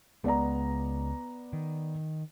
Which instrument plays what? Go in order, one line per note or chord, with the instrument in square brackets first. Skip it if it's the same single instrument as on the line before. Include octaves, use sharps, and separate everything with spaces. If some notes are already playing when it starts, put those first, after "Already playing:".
[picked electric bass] C#2 G#3 [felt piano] B3 D5 A#5
[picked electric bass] D#3